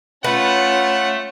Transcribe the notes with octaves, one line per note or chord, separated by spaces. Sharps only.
A3 C#4 F4 B4 F#5